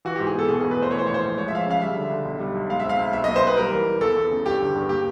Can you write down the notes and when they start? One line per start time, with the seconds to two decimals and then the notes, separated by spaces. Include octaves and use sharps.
0.05 E3 F#4
0.16 G#2 G4
0.27 G#4
0.34 B3 A4
0.49 B2 G#4
0.60 E2 G#4
0.71 B4
0.79 A3 C5
0.91 E3 C#5
0.99 C5
1.07 A#1 C#5
1.14 C5
1.23 A#1
1.37 G#3 C#5
1.48 E5
1.52 F3 F5
1.59 E5
1.67 C#3 F5
1.81 G3 E5
1.96 D3
2.11 D3
2.25 B1
2.40 G3
2.55 B1
2.70 G#3 F5
2.80 C4 E5
2.89 F5
2.99 B1
3.13 F#3 E5
3.24 A#3 D#5
3.36 C5
3.43 A#3 B4
3.57 G3 A#4
3.72 E3
3.87 G3
4.01 E2 A4
4.16 E2
4.31 C#3
4.46 G2 G4
4.61 D3
4.75 G2
4.89 A#3 G4